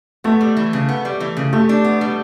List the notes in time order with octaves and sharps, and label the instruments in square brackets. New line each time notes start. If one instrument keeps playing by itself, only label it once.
[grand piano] A3 [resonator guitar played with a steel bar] B3
[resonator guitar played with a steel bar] G3
E3
C#3
B3
G3
E3
C#3
[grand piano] A3 [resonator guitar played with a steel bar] G4
[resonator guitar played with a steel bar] D4
B3
G3